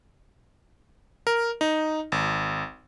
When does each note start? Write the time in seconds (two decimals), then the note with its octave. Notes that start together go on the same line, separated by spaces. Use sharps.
1.27 A#4
1.61 D#4
2.12 G#1